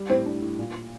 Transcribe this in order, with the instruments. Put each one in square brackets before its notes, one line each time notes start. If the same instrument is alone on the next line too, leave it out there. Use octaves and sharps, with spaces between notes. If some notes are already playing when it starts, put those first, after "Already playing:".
Already playing: [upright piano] G3
[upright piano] A2 [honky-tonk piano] C4
[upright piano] D4
A2
A#2